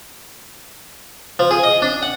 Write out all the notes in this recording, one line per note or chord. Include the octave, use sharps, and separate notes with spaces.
F3
G#4
D#5
D4
F#5